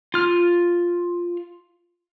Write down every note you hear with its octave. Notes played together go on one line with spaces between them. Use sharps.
F4 F6